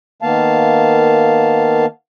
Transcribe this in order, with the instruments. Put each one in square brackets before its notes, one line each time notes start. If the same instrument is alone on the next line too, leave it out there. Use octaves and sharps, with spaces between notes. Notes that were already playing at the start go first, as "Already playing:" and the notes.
[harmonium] D#3 A#3 B3 F5 A5